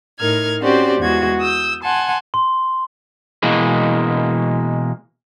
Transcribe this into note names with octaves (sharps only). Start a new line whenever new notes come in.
A2 D#4 A#4 F6 G#6
C4 C#4 F#4 G4 C5 D5
E2 G#3 F#4 G#6
D#6 E6 G6
F#5 G#5 A5 C6
C6
B2 E3 G#3 A#3